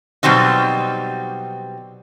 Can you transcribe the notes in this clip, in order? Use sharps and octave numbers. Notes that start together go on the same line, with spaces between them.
B2 F#3 G3 C4 D#4